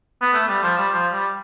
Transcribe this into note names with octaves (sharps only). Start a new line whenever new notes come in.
B3
A3
G3
F3
G3
F3
G3